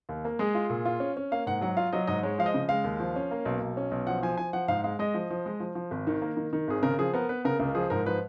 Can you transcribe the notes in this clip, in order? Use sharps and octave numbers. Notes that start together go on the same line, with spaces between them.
D#2
A#3
G#3 G#4
F4
A#2
F4
C#4
C#4
A#3 F5
G#2 F#5
F#3 F#5
F4 F5
F#3 D#5
G#2 D#5
G#3 C#5
F3 F5
D#5
C#3
G#3 F5
D#2
F3
C#4
A#3
B1
B1
C#4
B1
F3 F#5
F3 G#5
F3 G#5
F3 F#5
G#2 F5
G#3 F5
G#3 D#5
F3
F3
G#3
F3
F3
G#1
D#3
A#3
D#3
D#3
G#1 G#4
C#3 A#4
F3 G#4
B3 A#4
B3 B4
C#3 A#4
C#2 A#4
F3 G#4
G#2 A#4
F3 B4